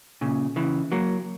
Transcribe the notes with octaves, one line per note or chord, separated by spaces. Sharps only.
A#2 C#3
C#3 E3
F#3 A#3